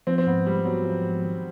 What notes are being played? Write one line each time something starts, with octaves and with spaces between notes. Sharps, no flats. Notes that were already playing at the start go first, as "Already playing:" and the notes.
F3 C4
C4
G#2 B3
G3 G#3
F#3 B3
F3
G#2
D#3